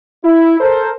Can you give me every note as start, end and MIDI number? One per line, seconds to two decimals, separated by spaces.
0.24 0.57 64
0.60 0.91 69
0.60 0.91 70
0.60 0.91 72